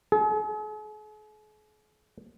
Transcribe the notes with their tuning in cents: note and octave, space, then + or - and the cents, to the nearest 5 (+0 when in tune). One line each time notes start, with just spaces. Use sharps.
G#4 +45